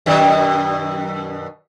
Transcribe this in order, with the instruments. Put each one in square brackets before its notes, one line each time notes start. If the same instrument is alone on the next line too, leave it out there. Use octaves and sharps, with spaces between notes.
[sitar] F#2 B2 D#3